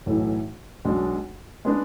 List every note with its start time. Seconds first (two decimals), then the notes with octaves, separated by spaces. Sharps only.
0.06 B1 A2 E3 A3 E4
0.85 B1 B2 G#3 D4
1.65 G#3 B3 D4